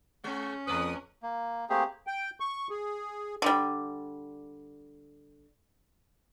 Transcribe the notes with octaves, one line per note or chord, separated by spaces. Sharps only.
G#3 C#4
F2 A3 B4 D#6
A#3
A3 A#3 C4 G4 G#4
G5
C#6
G#4
D3 G3